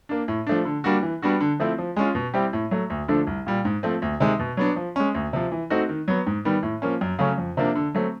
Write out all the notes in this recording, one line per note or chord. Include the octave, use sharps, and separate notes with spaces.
A#3 D4
A2
F3 A3 D4
D3
G3 A#3 D4 F#4
E3
G3 B3 D4 F#4
D3
F3 A3 C4 E4
F3
G#3 C#4 F4
B2
G3 C4 E4 G4
A2
F#3 A3
D2
D3 F3 A3 D4
C2
A#2 G3
G#2
F3 A3 C4
D2
C3 D#3 G#3
B2
F#3 B3 D4
F3
G#3 C#4
D2
C3 F3
E3
A3 C4 D#4 F#4
D#3
F#3 B3
G#2
D#3 G3 B3
A2
F3 A#3 C#4
F#2
C#3 F#3 A3 C#4
F2
C3 F3 A#3 D4
D3
F#3 A3 C4